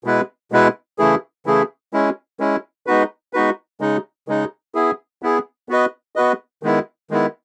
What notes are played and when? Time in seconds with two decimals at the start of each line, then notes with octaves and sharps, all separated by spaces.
0.04 B2 G#3 B3 E4 B4
0.52 B2 G#3 B3 E4 B4
0.98 C#3 E3 A3 E4 G#4
1.46 C#3 E3 A3 E4 G#4
1.93 G#3 C#4 E4
2.40 G#3 C#4 E4
2.87 G#3 B3 D#4 F#4 B4
3.33 G#3 B3 D#4 F#4 B4
3.80 C#3 G#3 D#4
4.28 C#3 G#3 D#4
4.75 B3 E4 G#4
5.22 B3 E4 G#4
5.69 B3 F#4 B4 D#5
6.16 B3 F#4 B4 D#5
6.63 D#3 G#3 B3 E4
7.10 D#3 G#3 B3 E4